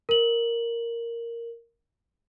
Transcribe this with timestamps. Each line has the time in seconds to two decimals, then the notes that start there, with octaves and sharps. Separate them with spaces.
0.09 A#4 F#7